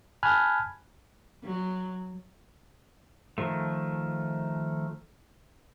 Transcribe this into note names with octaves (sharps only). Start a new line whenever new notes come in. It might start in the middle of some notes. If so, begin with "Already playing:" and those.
G#5 A5 B5 F6 F#6 G#6
F#3
D#3 F3 A3